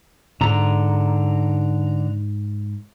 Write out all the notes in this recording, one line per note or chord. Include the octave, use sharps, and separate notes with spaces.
G#2 D3 A#5